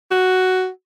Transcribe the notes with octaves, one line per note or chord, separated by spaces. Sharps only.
F#4